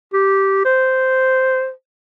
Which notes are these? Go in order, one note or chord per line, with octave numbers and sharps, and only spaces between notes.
G4
C5